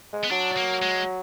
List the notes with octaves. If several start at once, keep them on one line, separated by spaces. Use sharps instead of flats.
G#3
B3
F#3 D4
A#3
G#3